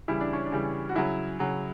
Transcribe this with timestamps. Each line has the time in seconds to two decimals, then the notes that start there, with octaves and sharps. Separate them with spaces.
0.08 C#3 E3 G3 E4
0.21 D4
0.33 C#4
0.46 D4
0.52 C#3 E3 G3
0.89 F#4
0.95 C#3 F#3 E4
1.39 C#3 F#3